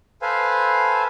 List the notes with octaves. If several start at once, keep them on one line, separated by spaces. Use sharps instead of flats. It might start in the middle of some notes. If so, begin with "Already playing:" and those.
A4 B4 C5 F5 G#5